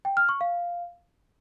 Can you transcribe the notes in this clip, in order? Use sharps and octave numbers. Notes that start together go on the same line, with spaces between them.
G5
F6
C#6
F5